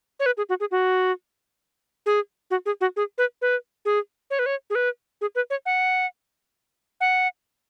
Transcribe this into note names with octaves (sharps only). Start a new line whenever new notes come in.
C#5
B4
G#4
F#4
G#4
F#4
G#4
F#4
G#4
F#4
G#4
B4
B4
G#4
C#5
B4
C#5
G#4
B4
G#4
B4
C#5
F#5
F#5